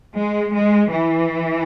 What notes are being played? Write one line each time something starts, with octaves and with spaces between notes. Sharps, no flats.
G#3
G#3
E3